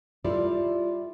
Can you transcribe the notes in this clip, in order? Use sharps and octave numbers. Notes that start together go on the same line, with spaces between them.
G3 E4 F4 A4 D5